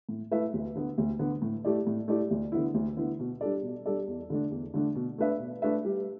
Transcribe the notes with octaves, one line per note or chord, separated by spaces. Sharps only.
A2
A3 E4 B4 E5
D2
D3 B3
D2
D3 B3
A2
A3 E4 G4 D5
A2
A3 E4 G4 D5
D2
D3 B3 E4
D2
D3 B3 E4
B2
G3 D4 A4 D5
B2
G3 D4 A4 D5
E2
D3 A3 D4
E2
D3 A3 D4
B2
A3 D4 B4 E5
B2
A3 D4 B4 E5
G3